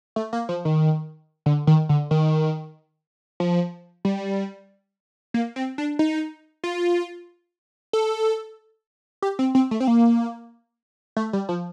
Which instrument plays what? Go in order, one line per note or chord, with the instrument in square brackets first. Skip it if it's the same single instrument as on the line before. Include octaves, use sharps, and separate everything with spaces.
[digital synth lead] A3
A#3
F3
D#3
D3
D#3
D3
D#3
F3
G3
A#3
C4
D4
D#4
F4
A4
G4
C4
C4
A3
C4
A#3
A3
G3
F3